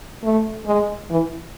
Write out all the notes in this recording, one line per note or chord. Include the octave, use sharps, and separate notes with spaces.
A3
G#3
E3